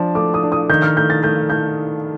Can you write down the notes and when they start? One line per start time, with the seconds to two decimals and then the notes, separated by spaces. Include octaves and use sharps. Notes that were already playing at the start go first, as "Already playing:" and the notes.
Already playing: F3 D4
0.15 A3 D6
0.34 D#6
0.43 D4
0.52 D#6
0.69 D#3 G6
0.82 F6
0.97 A3 G6
1.10 A6
1.23 A3 G6
1.50 A3 G6